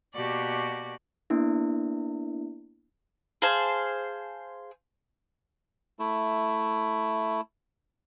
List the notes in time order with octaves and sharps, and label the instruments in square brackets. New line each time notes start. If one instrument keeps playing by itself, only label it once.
[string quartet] B2 A#3 F#4 G4 D5 C#6
[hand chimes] A#3 B3 D4 E4
[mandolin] G#4 C5 F5 A5
[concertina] A3 E4